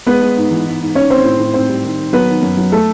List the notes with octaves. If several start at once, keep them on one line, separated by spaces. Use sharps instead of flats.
G#3 B3 B4
G#3
G#2
E3
G#2
G#2
G#2 C#4 C#5
D#3 C4 C5
A2
A2
G#2 C4 C5
G3
D#3
D#3
F#3 B3 B4
D#3
F#2
F#3
A3 A4